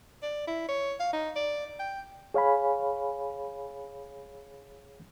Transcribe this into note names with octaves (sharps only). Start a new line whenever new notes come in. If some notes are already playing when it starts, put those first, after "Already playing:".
D5
E4
C#5
F5
D#4
D5
G5
G#4 C#5 F5 G#5 B5